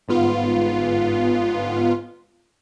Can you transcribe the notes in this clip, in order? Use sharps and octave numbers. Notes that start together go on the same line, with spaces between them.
G1 G#2 B3 F4